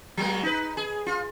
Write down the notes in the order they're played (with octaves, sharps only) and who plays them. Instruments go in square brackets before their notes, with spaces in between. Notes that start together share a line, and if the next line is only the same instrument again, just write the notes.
[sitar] F#3 G#3 A#3
D#4 B4
G#4
F4